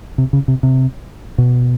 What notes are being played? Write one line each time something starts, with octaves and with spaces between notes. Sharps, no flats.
C3
C#3
C3
C3
B2